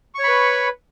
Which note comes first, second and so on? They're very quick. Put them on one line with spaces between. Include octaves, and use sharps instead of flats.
C#6 C#5 B5 B4